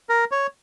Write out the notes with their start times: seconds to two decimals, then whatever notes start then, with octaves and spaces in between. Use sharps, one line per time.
0.09 A#4
0.31 C#5